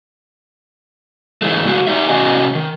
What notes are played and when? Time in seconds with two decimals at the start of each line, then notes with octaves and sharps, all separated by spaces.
1.42 G#2 D3 E3 G#3 A3
1.66 C#3 G#3 F#4 G4
1.87 D#4 G4 E5
2.09 A2 C3 C#4 F#4 D#5 G#5
2.55 D#3